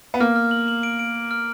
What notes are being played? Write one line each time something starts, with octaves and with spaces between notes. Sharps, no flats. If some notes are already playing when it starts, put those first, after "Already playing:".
B3
A#3 F6
F6
F#7
F#7
D7
D7
D7
F6